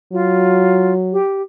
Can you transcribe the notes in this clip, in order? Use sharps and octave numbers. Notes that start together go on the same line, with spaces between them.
F#3 F4
G4